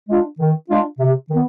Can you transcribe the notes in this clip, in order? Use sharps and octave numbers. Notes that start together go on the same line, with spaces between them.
G#3 D4 F4
D#3
G#3 D4 F4
C3
D#3 B3